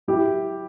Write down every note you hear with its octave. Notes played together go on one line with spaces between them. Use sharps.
F#3 E4 G4